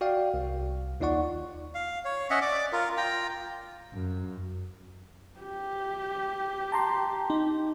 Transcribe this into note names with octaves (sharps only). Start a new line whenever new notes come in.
F#4 D5 F5 G5
C2
D#2 D#4 F4 D5 F#5 C#6
F5
C#5
C#4 D#5 E5 F#5
D5 D6
F4 A#4
F4 G5 A#5
F#2
G4
A5 A#5 C6
D#4